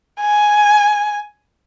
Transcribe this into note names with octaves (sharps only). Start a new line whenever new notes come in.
G#5